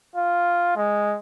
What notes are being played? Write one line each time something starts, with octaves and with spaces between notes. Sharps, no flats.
F4
G#3